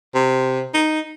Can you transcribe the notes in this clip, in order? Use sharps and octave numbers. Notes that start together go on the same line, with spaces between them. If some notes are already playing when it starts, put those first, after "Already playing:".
C3
D#4